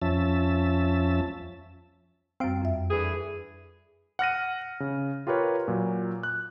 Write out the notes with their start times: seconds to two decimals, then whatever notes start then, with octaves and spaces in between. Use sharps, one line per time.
0.02 F2 F3 C#4 E5 A5
2.40 F#2 G3 C4 F5 G5 D7
2.62 F2 E5
2.91 D3 E3 G#4
4.19 F#5 F6 A#6 D#7
4.80 C#3
5.27 F4 G4 A#4 B4 C#5
5.68 A#2 F#3
6.23 F#6